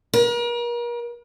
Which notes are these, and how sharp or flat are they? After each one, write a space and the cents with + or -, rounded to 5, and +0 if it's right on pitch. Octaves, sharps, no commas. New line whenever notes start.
A#4 +40